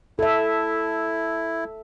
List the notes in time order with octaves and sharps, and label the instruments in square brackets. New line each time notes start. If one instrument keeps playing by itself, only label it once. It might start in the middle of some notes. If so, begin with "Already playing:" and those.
[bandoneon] E4 [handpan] A4 E5